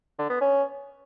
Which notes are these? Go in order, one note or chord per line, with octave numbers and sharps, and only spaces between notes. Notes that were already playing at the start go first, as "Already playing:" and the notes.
D3
B3
C#4